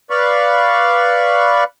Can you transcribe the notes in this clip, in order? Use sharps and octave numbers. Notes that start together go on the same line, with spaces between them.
B4 D5 F5 B5 C#6